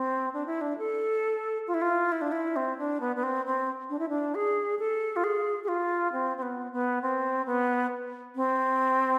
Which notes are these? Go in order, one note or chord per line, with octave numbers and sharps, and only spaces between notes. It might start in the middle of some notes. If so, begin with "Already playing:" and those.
Already playing: C4
D4
E4
D4
A4
F4
E4
F4
E4
D4
E4
C4
D4
B3
B3
C4
C4
D4
E4
D4
G#4
A4
F4
G#4
G#4
F4
C4
C4
B3
B3
C4
B3
C4